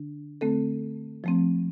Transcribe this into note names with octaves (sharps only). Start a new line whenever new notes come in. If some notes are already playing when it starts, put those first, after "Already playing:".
Already playing: D3 D4
D3 A3 C4 A4
F3 A3 C4